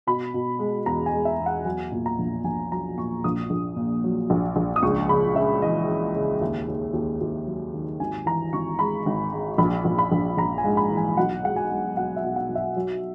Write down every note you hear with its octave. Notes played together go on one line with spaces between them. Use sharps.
B2 B5
B2
G#3
E2 A#5
G#5
G#3
E5
E2
F#5
F#3 G#5
A#2
A#5
A#1
A#1 G#5
F#3 A#5
A#2 C#6
A#1 D#6
A#1
A#2
F#3
A#1
A#1
D#6
C#2 C#6
C#3 B5
C#3 E5
E3 D#5
C#3
C#3
D#2 E5
D#2
D#2
D#2
F#3
D#3
G#1 G#5
E3 A#5
G#1 C#6
G#3 B5
G#1
G#3
A#1 B5
A#1
B5
A#1
A#1 A#5
G#5
G#2
B5
E3
G#5
B1 F#5
G#3 F#5
G#5
G#3
B2 F#5
E5
B2
F#5
B1
E5
F#3